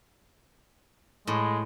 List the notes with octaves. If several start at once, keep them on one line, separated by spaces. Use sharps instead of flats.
A2 G#3